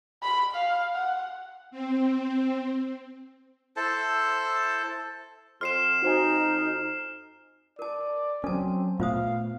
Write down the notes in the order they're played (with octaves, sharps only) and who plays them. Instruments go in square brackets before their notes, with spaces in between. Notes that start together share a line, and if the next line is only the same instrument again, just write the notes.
[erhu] B5
F5
F#5
[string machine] C4
[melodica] E4 A4 C5 A5
[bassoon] F2 [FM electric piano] C6 [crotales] F6 C7 E7
[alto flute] D#4 [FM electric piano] F#4 C5 G#5
[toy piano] A#4 A5 [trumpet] D5
[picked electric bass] F#3 C#4 [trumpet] C4 [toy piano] A4 A5
[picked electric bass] A#2 A3 B3 [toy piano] F4 C5 D#6 [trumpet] F5